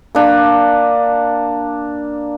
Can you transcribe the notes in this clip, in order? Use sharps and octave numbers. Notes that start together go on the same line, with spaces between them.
A#3 D4